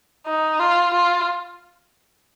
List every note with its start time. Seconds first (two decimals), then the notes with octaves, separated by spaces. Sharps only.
0.26 D#4
0.60 F4
0.94 F4